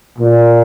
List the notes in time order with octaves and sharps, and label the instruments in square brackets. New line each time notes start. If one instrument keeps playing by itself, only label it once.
[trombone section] A#2